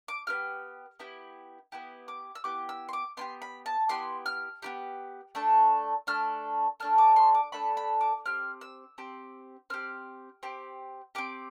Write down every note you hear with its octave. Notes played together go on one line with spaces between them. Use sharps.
D6
B3 E4 G4 F6
B3 E4 G4
B3 E4 G4
D6
E6
B3 E4 G4 D6
E6
C6
D6
B3 E4 G4 C6
B5
A5
B3 E4 G4 C6
F6
B3 E4 G4
A3 D4 A4
A3 D4 A4 F6
A3 D4 A4 F6
D6
C6
D6
A3 D4 A4 B5
B5
D6
C4 G4 F6
E6
C4 G4
C4 G4 F6
C4 G4
C4 G4 D6